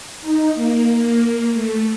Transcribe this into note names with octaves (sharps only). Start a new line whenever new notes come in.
D#4
A#3
A3